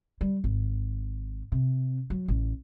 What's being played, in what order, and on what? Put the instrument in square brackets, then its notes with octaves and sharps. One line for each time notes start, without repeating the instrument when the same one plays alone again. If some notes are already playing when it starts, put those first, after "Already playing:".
[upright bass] G3
G#1
C3
F#3
A1